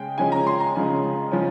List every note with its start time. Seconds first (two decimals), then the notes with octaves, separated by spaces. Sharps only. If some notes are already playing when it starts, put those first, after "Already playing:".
Already playing: C#3 G#3 C#4 G5
0.18 C#3 F3 G#3 C#4 G#5
0.32 A#5
0.47 C6
0.60 A#5
0.76 C#3 F3 G#3 C#4
1.32 C#3 F3 G#3 C#4